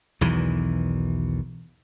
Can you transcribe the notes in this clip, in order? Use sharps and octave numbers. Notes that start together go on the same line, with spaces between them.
B1 E2 D#3 E3